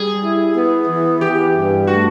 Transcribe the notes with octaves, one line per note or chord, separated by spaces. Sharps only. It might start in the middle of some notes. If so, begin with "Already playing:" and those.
Already playing: G3 G#4
E4
B3
E3
E3 G4
G2
A3 F#4